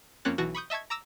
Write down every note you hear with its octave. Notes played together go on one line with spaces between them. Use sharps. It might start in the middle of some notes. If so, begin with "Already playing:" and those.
F2 A#3 C4 C#4 F#6 A6
B1 B2 E3 F#4 A5 A#6
B5 C#6 D#6 G6
D#5 E5 A5 C#6 G#6
A#5 D6 E6 A#6